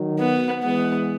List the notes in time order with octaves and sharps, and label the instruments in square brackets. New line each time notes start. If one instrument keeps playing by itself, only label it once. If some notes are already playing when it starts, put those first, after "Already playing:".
Already playing: [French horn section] D#3 F#3
[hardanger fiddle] B3
[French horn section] E3 G#3 [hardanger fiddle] B3